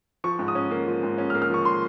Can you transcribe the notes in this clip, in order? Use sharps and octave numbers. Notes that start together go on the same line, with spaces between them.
F3 C#6
G#2
D#6
C#4
A#3
F3
G#2
C#4
F6
A#3
F6
F3 C#6
C6